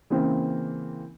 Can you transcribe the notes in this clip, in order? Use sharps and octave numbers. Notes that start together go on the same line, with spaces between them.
C#3 E3 A#3 C4